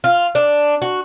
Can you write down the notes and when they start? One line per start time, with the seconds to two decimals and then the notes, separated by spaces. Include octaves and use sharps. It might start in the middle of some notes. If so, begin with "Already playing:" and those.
0.04 F4
0.35 D4
0.82 F#4